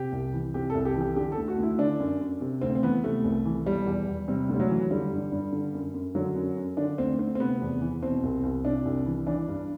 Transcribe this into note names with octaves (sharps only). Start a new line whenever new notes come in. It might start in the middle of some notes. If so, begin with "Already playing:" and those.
Already playing: C3 G4
C2
E3
C3 G4
C2 A4
G4
E3
G4
D3 G4
A4
D2
F#4
D2 E4
D3 D4
F#2
F#2
C3
D2 C4
C4
E3 B3
C3 A3
C2
E3
B2 G3
E2
E2
C3 G3
D2
G3
F#3
E3
D3 G3
G2
G2
D3
F#2
F#2
D3 F#3
F#2
F#2
D3 D4
D2 C4
D2 C4
C4
C3 B3
E2
E3
B2 C4
C2
C2
C3 D4
C2
E3
E3 D4
G2